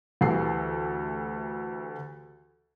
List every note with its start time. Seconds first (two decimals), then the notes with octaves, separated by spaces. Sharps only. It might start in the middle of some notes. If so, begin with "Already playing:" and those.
0.21 D2 E3 G4 A4 C7